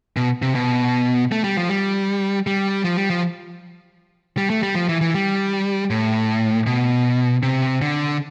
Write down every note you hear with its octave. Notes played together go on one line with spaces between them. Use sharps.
B2
C3
B2
A3
G3
F3
G3
G3
F3
G3
F3
G3
A3
G3
F3
E3
E3
G3
A2
B2
C3
D3